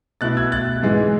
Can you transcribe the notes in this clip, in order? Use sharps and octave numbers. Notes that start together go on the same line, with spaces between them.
B2 A3 E4 F#6 A6
E6 G#6
F#6 A6
G#2 E3 G#3